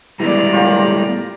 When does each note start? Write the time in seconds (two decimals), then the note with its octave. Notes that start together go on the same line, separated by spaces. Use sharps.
0.20 E3 G3 G#3 B3 D5 A#5
0.53 A2 F4 G4 A#4